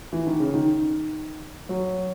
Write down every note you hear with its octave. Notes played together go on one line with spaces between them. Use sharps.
E3
D#3
C#3
D#3
F#3